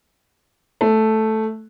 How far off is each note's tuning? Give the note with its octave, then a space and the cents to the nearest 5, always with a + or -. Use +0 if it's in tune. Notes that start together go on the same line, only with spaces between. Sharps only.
A3 -5